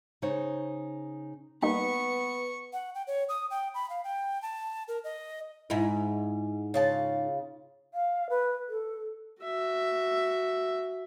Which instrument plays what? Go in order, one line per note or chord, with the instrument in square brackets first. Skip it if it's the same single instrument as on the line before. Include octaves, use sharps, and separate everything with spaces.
[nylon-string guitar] C#3 D#4 C5 C#5
[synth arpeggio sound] G3 A#3 D#4 [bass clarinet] B3 [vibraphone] B4 [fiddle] C#6
[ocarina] F#5
G5
C#5
D#6
G5
B5
F5
G5
A5
A#4
D#5
[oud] G#2 D#4 E4
[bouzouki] C#3 F4 A5
[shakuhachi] F5
B4
A4
[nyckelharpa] F#4 E5